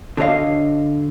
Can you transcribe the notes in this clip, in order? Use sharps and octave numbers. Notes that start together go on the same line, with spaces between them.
D3 D4 F#4 C#5 D#5 F5